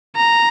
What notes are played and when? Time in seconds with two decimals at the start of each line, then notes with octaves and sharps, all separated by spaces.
0.16 A#5